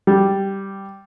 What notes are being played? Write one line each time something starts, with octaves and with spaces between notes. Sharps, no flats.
G3